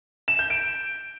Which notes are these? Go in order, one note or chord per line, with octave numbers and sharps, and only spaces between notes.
E7
G6
D7